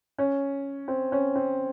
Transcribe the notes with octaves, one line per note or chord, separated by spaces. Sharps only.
C#4
C4
C#4
C4